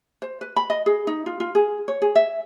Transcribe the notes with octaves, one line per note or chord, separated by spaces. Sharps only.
C5
B4
B5
D#5
G#4
D#4
F4
F4
G#4
C#5
G#4
E5